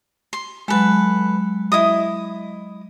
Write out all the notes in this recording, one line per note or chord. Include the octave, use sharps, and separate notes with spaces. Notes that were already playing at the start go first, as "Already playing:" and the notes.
C6
F#3 G#3 A4 B4
E4 D#5 D#6